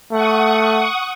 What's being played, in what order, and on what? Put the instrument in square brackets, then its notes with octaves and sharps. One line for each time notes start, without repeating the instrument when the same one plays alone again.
[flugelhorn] A3 [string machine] F#5 C#6 D#6